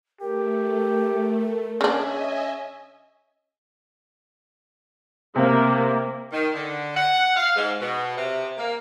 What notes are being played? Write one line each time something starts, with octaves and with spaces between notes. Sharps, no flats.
A3 G4 A#4
C#3 C#4 D4 D#5 E5 G#5
C3 A#3
D#3
D3
F#5
F5
G#2
B2
C3
A#3